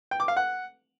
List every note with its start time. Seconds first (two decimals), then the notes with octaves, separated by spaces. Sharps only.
0.11 G5
0.20 D6
0.28 F5
0.37 F#5